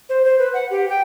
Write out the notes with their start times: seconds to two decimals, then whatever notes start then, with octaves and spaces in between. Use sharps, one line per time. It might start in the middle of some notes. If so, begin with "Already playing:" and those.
0.09 C5
0.25 C5
0.39 B4
0.54 F#5
0.70 G4
0.90 G5